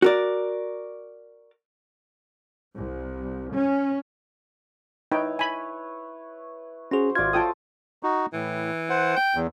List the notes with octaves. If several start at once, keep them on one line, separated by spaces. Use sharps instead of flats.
F#4 A#4 D5
C2
C#4
D#4 E4 B4 C#5 G5
G#5 B5
C#4 F#4 G#4 C5
G#1 F4 D5 E5 G#6
F4 A4 C#5 G5 A5 D#6
D#4 F#4
A2 E3
C5 F#5
G5
E2